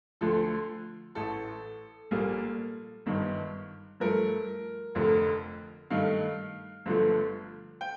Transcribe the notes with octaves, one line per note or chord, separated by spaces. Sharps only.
D2 D3 F3 A3 A4
A1 A2 A3 A4
A#1 A#2 G3 A#3
G1 G2 D#3
G2 F3 A3 A#4
F1 F2 D3 A3
G2 D#3 A3 F5
G1 G2 D3 F3 A3
G5